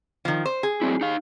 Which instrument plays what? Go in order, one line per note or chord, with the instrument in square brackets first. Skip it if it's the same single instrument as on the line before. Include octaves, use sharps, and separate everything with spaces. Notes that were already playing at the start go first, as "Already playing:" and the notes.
[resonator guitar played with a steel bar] D#3 F3
C5
G#4
[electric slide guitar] F#3 C4 E4
D#4 F5